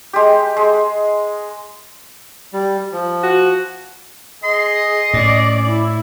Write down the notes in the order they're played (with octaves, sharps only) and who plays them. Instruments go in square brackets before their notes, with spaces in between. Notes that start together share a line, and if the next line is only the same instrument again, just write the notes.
[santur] G#3 G4
G#3
[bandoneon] G3
F3
[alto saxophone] F#4
[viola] G#4 [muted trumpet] D#5 [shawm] C6
[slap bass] A2 [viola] C#4 D5
[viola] E4